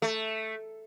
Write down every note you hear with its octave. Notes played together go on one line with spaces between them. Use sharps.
A3